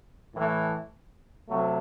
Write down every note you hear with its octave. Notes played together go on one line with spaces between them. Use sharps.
A2 E3 A3
C3 F#3 A3